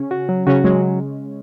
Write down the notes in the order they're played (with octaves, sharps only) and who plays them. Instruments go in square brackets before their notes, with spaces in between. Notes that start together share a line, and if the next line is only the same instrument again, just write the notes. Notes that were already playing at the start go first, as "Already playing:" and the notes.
Already playing: [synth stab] C#3 C#4
[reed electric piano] F#4
F#3
[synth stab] C#3 C#4 [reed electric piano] F#4
[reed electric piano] F#3 [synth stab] G#3